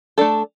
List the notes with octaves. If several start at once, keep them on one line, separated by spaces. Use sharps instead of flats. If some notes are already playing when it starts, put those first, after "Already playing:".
A3 D4 A4